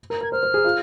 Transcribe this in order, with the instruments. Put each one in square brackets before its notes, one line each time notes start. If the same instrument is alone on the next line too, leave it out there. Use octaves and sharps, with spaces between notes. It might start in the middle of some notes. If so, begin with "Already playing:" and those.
[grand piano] A#4
[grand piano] A#4 [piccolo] G#6
[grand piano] C5 [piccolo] F6
[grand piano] C5
G#4
F4